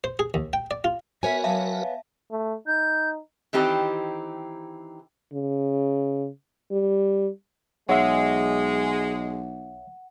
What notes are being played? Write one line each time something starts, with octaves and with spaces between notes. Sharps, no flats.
C5
G#4
D#2
G5
D5
F4
B3 F#4 A#4 B4 C#5 E5 G#5
F#3 E5 F5 A5
A3
D#4 G6
D#3 E3 C4 D#4 G4 A4
C#3
G3
B1 G#3 C#5 E5 F#5